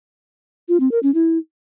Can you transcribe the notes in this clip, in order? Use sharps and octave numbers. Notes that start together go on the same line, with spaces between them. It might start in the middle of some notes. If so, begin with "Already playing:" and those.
F4
C4
A#4
C#4
E4